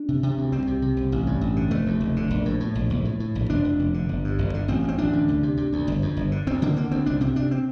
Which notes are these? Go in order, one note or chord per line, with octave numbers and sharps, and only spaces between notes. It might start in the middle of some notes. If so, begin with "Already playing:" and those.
Already playing: D4
C3
C3
D2
C2 C4
C3
C3
C2
A1
G2
A1
D3
F1 A3
D#2
F1
D3
A#1
A2
A2
A#1
A#1
A2
A2
A#1
F1 D4
F2
F1
D3
G1
G2
G1
D3
A1 C4
G2
C4
A1 D4
D3
D2
C3
C3
D2
G1
F2
G1
D3
D2 C4
D3 A#3
D3 A#3
D2 C4
C2 D4
C3 C4
C3 D4
C4